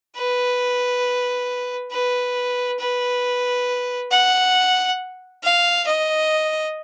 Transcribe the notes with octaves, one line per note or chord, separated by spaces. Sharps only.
B4
B4
B4
F#5
F5
D#5